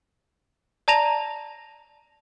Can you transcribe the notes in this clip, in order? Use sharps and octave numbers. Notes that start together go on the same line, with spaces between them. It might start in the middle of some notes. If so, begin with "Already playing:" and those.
D5 A5 A#5 A#6 F7